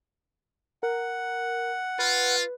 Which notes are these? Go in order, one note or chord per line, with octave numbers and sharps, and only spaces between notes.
A#4 F#5
F4 B4